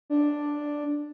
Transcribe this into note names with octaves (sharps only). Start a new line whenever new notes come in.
D4